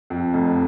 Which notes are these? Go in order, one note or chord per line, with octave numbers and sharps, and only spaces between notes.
F2
F1